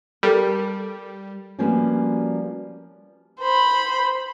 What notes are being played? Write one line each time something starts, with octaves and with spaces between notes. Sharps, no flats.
G3 A4 A#4
F3 G3 A#3 C#4 F#4 B4
C5 B5